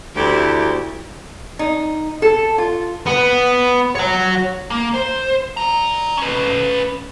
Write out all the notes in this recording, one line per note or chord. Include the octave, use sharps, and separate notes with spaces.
D2 E4 G4
D#4
A4
F4
B3
C#5 F#5
A#3
C5
D5 A#5
C#4 B4